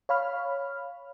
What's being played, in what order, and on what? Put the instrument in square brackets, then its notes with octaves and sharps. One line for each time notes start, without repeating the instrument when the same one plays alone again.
[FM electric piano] C#5 F5 B5 F6